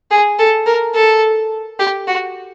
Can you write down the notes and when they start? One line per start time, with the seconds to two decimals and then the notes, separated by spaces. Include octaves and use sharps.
0.11 G#4
0.39 A4
0.66 A#4
0.95 A4
1.79 G4
2.08 F#4